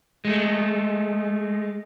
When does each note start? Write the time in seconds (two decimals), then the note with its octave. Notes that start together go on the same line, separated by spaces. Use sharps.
0.25 G#3 A3